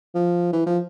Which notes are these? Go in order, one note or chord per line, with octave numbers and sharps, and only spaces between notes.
F3
E3
F3